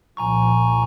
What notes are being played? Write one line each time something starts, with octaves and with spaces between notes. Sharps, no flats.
C2 A#2 F3 G#5 A#5 C#6